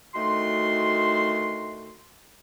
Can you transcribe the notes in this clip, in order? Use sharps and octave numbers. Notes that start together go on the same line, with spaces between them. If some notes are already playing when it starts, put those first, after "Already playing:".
D2 D#3 A3 F#4 C6